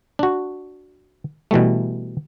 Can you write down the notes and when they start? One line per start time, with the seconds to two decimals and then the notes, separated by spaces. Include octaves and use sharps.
0.19 D4 F#4
1.51 B2 E3 G3 A3